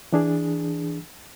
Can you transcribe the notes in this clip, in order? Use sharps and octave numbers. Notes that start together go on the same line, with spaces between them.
E3 D4 G#4